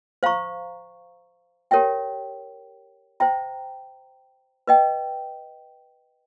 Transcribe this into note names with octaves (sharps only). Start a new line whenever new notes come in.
C5 F5 A#5 C#6
G4 A#4 C#5 E5 G5
C5 E5 G5 A#5
B4 D#5 G5